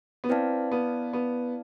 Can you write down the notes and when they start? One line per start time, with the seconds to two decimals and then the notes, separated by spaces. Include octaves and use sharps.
0.24 B3
0.29 C4 E4 B4 D5 F5 A5
0.72 B3
1.13 B3